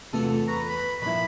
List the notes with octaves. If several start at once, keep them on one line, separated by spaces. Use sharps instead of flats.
E2 C3 A3 F4 F#4 A4
B4 A#5 C#6
B5
A#2 F3 E4 B5